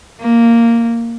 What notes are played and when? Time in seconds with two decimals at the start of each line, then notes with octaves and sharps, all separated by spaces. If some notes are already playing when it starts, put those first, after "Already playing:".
0.21 A#3